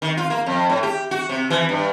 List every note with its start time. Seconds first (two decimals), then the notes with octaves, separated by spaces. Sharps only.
0.02 D#3
0.17 F4
0.30 A#3
0.46 F2
0.70 A2
0.83 G4
1.11 F#4
1.29 C3
1.50 E3
1.69 G2